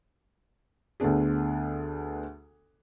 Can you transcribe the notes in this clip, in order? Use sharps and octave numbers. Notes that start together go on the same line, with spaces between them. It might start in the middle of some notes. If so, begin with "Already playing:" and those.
D2 D3 B3 D4 G#4